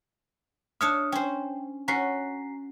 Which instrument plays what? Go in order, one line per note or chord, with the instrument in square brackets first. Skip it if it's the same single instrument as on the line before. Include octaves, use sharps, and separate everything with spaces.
[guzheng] D4 C#5 E5 [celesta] D#6 F6
[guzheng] C#4 C5 [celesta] G5
[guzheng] C#4 F#4 [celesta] A#5 B6 C7